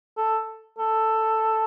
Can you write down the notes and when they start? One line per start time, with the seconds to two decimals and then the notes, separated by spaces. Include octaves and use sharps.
0.17 A4
0.78 A4